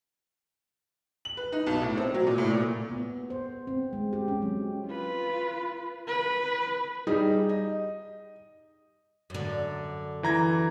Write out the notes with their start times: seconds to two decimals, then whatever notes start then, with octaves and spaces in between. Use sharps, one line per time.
1.25 F#7
1.37 B4
1.52 D#4
1.66 B1
1.81 A2
1.97 C4
2.14 F#3
2.27 A#2
2.38 A2
2.50 A#2
2.90 B3
3.30 C5
3.67 C4
3.93 G#3
4.13 G4
4.28 C#4
4.42 F#3
4.87 F4 B4
6.08 B4
7.07 G3 D#4 G#4 D#5
7.49 D#5
9.30 F#2 D3
10.23 E3 A#5 G#6